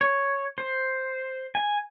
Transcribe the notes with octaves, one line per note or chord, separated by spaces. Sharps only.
C#5
C5
G#5